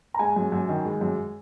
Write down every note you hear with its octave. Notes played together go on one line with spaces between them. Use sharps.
A#5
G#3 G#5
F#2
F#2
D#3
G#3
F#2